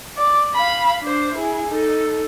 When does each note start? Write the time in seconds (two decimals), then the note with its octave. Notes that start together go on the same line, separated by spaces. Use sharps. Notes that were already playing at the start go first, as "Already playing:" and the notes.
0.17 D5
0.55 F5 B5
1.02 D4 C5
1.35 E4 G#4
1.68 D#4 A4